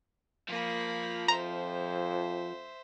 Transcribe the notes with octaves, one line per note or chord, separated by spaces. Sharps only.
F3 A#3 B5
F2 C5 E5 A#5